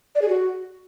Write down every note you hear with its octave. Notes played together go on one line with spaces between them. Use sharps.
D5
G#4
F#4